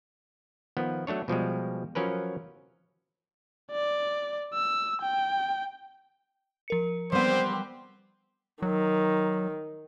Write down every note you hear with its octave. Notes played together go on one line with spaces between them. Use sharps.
D#3 F3 B3
F#3 A3 D4 C#5
B2 F3 G3 G#3
F3 F#3 C#4 A#4 B4
D5
E6
G5
F3 A#4 C#7
G3 B3 C4 G4 C5
D#3 F#3